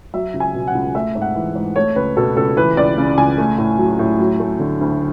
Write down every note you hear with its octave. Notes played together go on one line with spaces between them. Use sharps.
F#3 E5
C#2
G#5
B2
F#5
C#2
A3 E5
G#2
F#5
E3
G#2
A3 C#5
C#2 B4
B2 A4
C#2 A4
E3 B4
C#2 D5
C#3
C#2 G#5
A3
A2
F#3
A2
F#3
A3
D3
D2